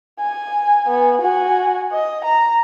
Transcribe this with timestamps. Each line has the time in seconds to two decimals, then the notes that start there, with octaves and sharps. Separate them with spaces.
0.20 G#5
0.86 B3 G#5
1.21 F#4 G#5
1.92 D#5
2.24 A#5